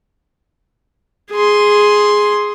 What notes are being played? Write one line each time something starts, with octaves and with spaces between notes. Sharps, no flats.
G#4 C6